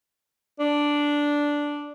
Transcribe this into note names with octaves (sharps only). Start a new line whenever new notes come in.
D4